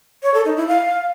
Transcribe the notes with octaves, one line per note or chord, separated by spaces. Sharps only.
C#5
A4
D#4
E4
F5